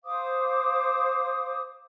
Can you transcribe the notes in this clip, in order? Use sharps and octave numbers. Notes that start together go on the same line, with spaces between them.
C5 F5 D6 D#6